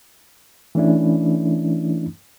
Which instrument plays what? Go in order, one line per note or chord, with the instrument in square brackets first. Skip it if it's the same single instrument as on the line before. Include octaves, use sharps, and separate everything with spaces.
[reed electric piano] E3 A3 C#4 D4 E4